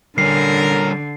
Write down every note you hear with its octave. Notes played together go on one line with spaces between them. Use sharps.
D3 G3 C#4 A#4 C7